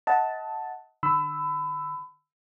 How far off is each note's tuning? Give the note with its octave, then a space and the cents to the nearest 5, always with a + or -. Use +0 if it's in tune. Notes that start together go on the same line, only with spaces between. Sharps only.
D#5 +35 F#5 +0 A5 +0
D3 +30 B5 +30 E6 +0